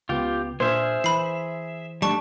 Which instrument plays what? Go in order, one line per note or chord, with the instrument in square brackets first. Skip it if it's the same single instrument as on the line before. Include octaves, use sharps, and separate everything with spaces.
[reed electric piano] C#2 B3 [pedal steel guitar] F4 G4
[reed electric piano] A#2 D4 F6 [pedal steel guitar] G#4 E5 [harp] C5
[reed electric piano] E3 [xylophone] B5 C7
[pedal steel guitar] G3 A3 D4 [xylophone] A5 C#6